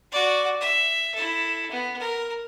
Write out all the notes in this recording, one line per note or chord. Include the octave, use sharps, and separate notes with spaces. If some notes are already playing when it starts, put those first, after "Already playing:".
F#4 D5
E5
E4 A4
B3
A#4